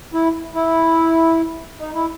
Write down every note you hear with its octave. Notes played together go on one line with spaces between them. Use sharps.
E4
E4
D#4
E4